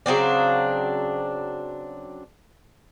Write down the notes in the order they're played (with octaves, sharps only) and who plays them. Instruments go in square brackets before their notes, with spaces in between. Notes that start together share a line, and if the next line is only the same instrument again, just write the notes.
[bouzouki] C#3 F#3 C4 D4